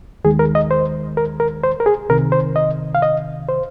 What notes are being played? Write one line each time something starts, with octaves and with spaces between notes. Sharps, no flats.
D#2 D#3 G#3 G#4
A#4
D#5
C5
A#4
A#4
C5
A#4
G#4
C2 C3 D#3 A#4
C5
D#5
F5
D#5
C5